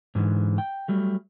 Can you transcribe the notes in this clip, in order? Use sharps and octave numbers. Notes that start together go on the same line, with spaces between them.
G#2 D3 E3
G5
F#3 G3 A3